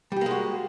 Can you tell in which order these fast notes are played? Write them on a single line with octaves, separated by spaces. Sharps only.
G3 G4 A#3 G#3 F#4